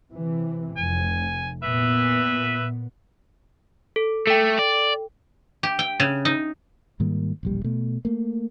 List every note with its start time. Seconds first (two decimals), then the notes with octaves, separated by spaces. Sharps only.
0.12 C3 E3
0.78 F1 G#5
1.63 A#2 B3 B4 E5
3.96 A4
4.27 A3 A4 G5
4.59 D5
5.63 G4
5.79 G5
6.00 C#3
6.25 D#4
7.00 G#2 D#3 G3 A#3
7.43 E1 A#1 G3
7.64 B2 A3
8.05 A3 A#3